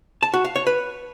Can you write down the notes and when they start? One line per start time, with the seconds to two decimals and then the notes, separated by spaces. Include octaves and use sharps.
0.23 A5
0.34 F#4
0.45 F5
0.56 C#5
0.67 B4